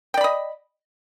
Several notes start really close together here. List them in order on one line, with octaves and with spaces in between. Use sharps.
G5 D5 B5 D#5